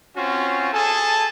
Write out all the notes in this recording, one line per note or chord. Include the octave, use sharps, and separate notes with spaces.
C4 C#4 F4 F#4
G#4 A4 G#5 A5